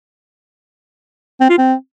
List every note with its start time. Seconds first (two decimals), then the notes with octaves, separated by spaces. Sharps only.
1.41 C4
1.49 F4
1.58 C4